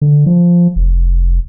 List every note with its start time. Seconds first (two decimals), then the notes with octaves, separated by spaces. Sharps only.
0.01 D3
0.26 F3
0.76 F1